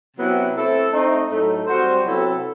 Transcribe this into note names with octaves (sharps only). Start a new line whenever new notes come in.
C3 F#3 B3 E4
A3 C4 E4 A4
A3 C4 D#4
A2 F#3 A3 D#4
G3 C4 F#4 C5
C3 F#3 B3 E4 A4